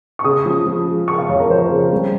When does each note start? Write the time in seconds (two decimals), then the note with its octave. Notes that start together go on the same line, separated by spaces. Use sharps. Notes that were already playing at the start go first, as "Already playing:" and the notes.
0.19 C#6
0.24 C#3 D#6
0.45 F3
0.66 F3
0.87 G#3
1.08 C#3 C#6
1.18 F5
1.29 F2 C#5
1.40 A#4
1.50 F3 C5
1.71 C#3
1.92 G3